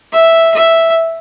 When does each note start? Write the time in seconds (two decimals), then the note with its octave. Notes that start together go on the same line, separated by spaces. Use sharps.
0.13 E5
0.54 E5